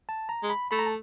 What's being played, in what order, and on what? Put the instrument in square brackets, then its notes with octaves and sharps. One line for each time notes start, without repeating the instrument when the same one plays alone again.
[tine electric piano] A5
A#5
[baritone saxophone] G#3
[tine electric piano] B5
[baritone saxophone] A3 [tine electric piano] B5
[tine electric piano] A#5
A5